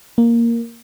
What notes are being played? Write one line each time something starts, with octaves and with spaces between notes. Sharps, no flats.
A#3